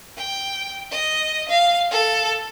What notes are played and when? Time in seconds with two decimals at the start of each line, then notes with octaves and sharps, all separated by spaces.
0.17 G5
0.91 D#5
1.49 F5
1.91 A4